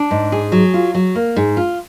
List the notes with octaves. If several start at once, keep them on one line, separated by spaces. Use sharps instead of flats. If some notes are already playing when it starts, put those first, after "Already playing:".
Already playing: D4
G#2
G#4
F#3
F4
F#3
A#3
G#2
F4